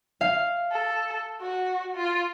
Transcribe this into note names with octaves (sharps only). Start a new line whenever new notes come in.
F5
A4
F#4
F4